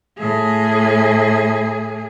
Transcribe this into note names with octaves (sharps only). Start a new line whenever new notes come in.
A2 G#4